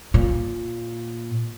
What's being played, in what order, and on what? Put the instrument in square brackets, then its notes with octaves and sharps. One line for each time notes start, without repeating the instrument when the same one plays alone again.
[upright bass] A#2